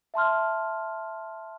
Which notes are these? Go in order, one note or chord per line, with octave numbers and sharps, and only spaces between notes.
E5 A5 C6 F6